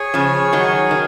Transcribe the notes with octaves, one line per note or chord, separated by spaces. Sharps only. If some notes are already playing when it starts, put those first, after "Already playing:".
Already playing: G#4 C#5 G#5
C#3 F3
D#3 F#3
D#3